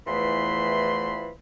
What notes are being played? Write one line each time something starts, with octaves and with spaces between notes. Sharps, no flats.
E2 E3 F3 A3 B5 C6